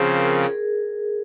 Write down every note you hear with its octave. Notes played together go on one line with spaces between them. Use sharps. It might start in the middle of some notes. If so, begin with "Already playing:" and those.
Already playing: C#3 F3 C4 G#4
A#4
G#4